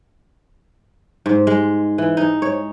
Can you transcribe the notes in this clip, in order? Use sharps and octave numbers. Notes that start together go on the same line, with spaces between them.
G#2
G#3
E3
D#4
C#5